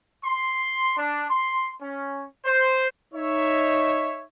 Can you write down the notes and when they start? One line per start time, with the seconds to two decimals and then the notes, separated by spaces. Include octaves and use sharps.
0.24 C6
0.97 D4
1.29 C6
1.81 C#4
2.45 C5
3.14 D#4 C#5 E5